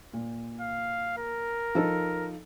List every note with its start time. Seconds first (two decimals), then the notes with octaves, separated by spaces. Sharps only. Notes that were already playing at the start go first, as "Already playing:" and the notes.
0.13 A#2
0.61 F5
1.18 A#4
1.75 F3 D#4 A4